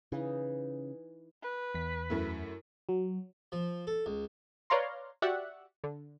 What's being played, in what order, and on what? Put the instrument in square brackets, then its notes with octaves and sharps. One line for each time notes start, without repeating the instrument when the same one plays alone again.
[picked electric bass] C#3 [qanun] E3 D#4
[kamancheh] B4
[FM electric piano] E2 B6
[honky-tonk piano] F#2 A3 E4
[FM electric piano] F#3
[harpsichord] F3
A4
C#2
[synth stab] B4 C#5 D5 F5 A#5 C6
F#4 G4 D5 E5 F#5
D3